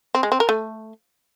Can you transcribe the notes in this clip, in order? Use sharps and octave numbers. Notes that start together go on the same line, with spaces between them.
C4
G#3
C4
A#4
A3